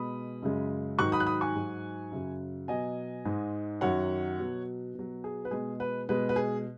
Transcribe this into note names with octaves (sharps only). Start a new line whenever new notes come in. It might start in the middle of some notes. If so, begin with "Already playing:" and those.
Already playing: B2 G#3 B5 D#6
F#2 C#3 G#3
G#2 D#3 F#3 C#6 F#6
B5 D#6
F#6
B5 D#6
G#5 C#6
G#2 F#3
F#2 C#3 F#3
B2 F#3 D#5 G#5
G#2 G#3
F#2 D#3 F#3 C#5 F#5
B2 F#3
B2 F#3
G#4
B4
B2 G#3 G#4
B4
B2 G#3 B4
B4
G#4